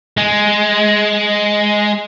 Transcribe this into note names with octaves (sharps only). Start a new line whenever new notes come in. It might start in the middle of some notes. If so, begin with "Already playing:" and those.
G#3